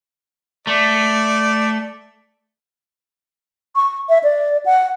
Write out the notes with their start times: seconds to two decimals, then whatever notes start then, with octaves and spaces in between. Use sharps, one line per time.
0.67 A3 D5
3.76 C#6
4.09 E5
4.24 D5
4.66 F#5